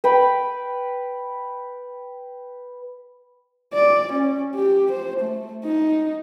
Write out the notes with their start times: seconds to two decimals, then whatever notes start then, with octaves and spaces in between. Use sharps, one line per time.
0.04 B4 G5 B5
3.74 D5
4.13 C#4
4.55 G4
4.92 C5
5.20 A3
5.64 D#4